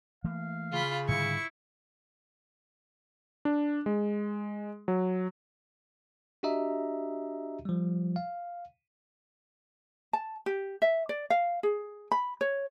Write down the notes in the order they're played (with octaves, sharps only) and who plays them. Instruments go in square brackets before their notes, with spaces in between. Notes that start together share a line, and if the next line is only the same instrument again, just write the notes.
[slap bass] E3 A3 A#3 [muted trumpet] F5
[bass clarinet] C#3 [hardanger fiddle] F4 B5
[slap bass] G#2 D3 G3 [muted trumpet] E4 [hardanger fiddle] C#6
[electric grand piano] D4
G#3
F#3
[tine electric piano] D4 F#4 G4 D#5 E5 A#5
F3 G3
F5
[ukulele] A5
G4
E5
D5
F5
G#4
B5
C#5